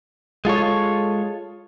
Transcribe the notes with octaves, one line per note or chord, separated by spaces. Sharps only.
G#3 F4 A4 C#5